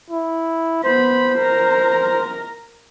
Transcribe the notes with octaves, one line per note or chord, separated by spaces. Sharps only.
E4
B3 C5 B5
A#4 A#5